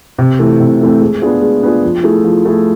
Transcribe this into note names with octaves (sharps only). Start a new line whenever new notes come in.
C3
E3 A3 C4
C3
E3 A3 C4
G#3
B3 D4 F4 G#4
G#3
B3 D4 F4 G#4
F3
A3 E4 G#4
F3
A3 E4 G#4